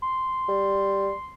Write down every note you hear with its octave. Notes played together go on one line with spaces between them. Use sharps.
C6
G3